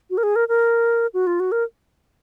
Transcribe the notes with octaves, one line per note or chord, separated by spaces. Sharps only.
F#4
A#4
G#4
A#4
A#4
F#4
F4
F#4
A#4